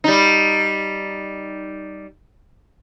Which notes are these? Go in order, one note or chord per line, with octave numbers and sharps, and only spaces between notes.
G3 D#4